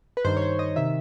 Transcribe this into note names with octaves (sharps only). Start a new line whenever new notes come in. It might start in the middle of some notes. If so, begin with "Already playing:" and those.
B4
G2 D#3 C5
C#5
C5
D#5
C3 D#3 E5